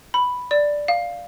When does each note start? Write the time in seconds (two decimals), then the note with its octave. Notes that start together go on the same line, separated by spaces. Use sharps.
0.14 B5
0.51 D5
0.88 F5